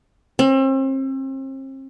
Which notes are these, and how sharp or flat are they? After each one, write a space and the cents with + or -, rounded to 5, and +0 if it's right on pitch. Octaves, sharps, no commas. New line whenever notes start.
C4 +40